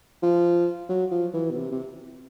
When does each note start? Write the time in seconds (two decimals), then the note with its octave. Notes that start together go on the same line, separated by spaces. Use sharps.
0.23 F3
0.89 F#3
1.11 F3
1.34 E3
1.50 B2
1.56 C3
1.72 C3